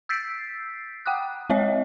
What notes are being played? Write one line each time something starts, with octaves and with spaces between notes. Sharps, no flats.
E6 G6 A6 B6 C7 D7
F#5 G5 D6 D#6 F#6
G#3 C4 C#5 D#5 E5